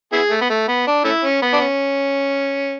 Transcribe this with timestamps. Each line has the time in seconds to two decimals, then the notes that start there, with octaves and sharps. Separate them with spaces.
0.13 B3 E4 G#4
0.31 A3
0.41 B3
0.50 A3
0.68 B3
0.87 D4
1.04 A3 C#4 E4
1.24 C#4
1.42 B3
1.53 D4
1.61 C#4